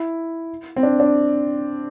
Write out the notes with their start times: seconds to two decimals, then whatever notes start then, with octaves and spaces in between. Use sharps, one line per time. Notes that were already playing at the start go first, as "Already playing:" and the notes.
Already playing: E4
0.76 C4
0.83 D4
1.00 D4